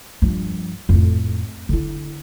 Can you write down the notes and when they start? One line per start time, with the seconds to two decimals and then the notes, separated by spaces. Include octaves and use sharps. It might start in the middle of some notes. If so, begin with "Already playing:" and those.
0.22 G2 F3
0.89 F2 A2
1.69 D3 E4